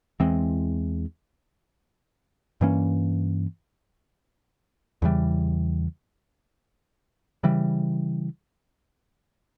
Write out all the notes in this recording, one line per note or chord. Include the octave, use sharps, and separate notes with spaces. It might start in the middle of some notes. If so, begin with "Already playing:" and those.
E2 E3 G#3 C4
G2 E3 A#3 C#4
E2 C#3 E3 G3
C#3 E3 G3